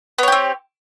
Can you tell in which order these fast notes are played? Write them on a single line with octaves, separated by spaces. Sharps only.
B3 C#5 G4 C4